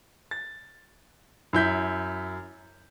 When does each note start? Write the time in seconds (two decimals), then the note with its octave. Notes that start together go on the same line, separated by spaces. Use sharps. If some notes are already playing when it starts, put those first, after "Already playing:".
0.31 A6
1.53 F#2 E4 G6 B6